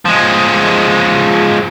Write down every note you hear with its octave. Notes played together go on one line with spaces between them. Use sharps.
F3 G#3